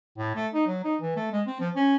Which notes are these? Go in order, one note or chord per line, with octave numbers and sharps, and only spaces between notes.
A2
A3
D#4
F#3
D#4
E3
A3
G#3
C4
F3
C#4